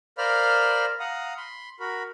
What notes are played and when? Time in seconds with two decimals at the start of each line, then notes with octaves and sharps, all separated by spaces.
0.18 A#4 C5 D5 F5 B5 F6
1.00 F5 F#5 A#5 D#6
1.37 B5 C6
1.80 F#4 A#4 B5